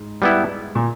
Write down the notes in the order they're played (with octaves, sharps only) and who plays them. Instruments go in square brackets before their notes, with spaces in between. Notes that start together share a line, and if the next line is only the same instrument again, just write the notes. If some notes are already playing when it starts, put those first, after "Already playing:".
Already playing: [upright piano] G#2
[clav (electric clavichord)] G3 B3 E4
[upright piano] A#2